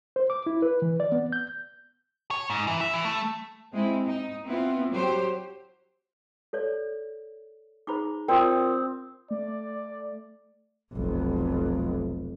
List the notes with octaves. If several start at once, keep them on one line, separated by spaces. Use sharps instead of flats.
C5
D6
E4
B4
E3
D5
B3
G6
C#5
G#2
E3
E5
E3
A3
G#3 C4 E4
D#4
B3 C4 E4 F4
F#3 G4 C5
A4 C#5 D5
D#4 G#4 C5 A#5 B5 D6
C4 F4 A#4 D5 G5 C6 D#6
A3 D5
F1 B1